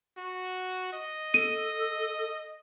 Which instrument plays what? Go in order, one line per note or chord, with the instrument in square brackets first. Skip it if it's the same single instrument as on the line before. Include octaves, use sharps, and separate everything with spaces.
[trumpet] F#4
D#5
[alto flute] A4 [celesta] D#7